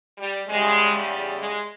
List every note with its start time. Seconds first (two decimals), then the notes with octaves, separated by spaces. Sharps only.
0.18 G3
0.48 E2 C#3 G3 G#3
1.39 G#3